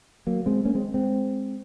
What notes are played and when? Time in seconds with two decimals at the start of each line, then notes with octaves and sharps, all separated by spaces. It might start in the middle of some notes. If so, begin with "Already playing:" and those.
0.27 F#3 A#3
0.46 G#3 C4
0.65 A#3 C#4
0.75 G#3 C4
0.94 G#3 C4